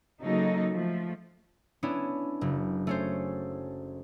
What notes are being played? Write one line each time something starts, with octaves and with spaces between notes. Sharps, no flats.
C#3 F#3 A#3 D#4 A4
F3 A3
B3 C#4 D4 E4
F#1
A3 C#4 C5